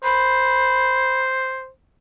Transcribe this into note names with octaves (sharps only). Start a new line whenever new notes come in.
C5 B5